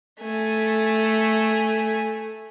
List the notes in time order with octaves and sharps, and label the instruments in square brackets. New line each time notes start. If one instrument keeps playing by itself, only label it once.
[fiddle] A3 G#5